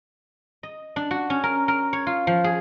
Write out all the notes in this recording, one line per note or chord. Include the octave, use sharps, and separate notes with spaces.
D#5
D4
F#4
C#4
A#4
A#4
C#5
F4
F3
G#4